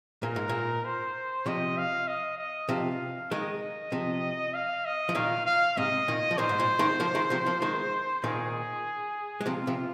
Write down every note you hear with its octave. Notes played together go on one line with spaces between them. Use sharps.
A#2 A#4
G#2
A#2
C5
C3 F3 D#5
F5
D#5
D#5
C3 F3 F5
D#3 G#3 D#5
C3 F3
F5
D#5
F3
A#2 D#3 F5
F5
G#2 C3 D#5
A#2 D#3
F3
A#2 D#3 C5
G#2
A#2
D#3 G#3
F3 A#3
D#3 G#3
C3 F3
F3 A#3
D#3 G#3
A#2 D#3 G#4
G#3
C3 F3 F4
C3 F3